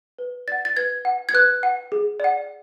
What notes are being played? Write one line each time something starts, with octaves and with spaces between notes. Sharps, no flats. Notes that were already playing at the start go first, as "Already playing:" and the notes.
B4
D5 F#5 A6
A6
B4 G#6
F#5
G#6
B4 F#6
F#5
G#4
D5 F#5